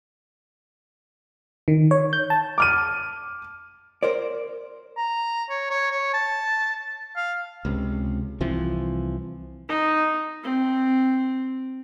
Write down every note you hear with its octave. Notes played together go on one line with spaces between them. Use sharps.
D#3
C#5
G6
A5
D6 F6 D#7
A#4 C5 D5
A#5
C#5
C#5
C#5
A5
F5
C#2 C3
C2 E3 F3 C4
D#4
C4